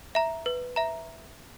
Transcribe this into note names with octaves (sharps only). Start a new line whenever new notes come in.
E5 A#5
B4
E5 A#5